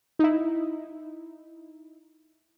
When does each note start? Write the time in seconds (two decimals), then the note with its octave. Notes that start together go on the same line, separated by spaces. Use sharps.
0.19 D#4 E4